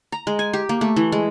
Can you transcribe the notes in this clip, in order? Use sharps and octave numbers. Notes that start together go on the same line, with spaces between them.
A#5
G#3
G#5
G4
A#3
A3
E3
G#3